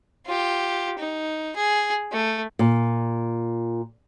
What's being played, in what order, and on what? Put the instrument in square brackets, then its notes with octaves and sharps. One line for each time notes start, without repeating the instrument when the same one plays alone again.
[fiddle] F4 G4
D#4
G#4
A3
[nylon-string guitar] A#2